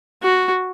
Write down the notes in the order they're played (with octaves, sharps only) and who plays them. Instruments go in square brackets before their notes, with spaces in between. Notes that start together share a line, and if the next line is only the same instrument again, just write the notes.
[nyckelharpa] F#4